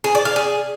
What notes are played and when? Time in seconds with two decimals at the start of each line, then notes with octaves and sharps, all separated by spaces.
0.04 G#4
0.15 D5
0.25 F5
0.36 G#4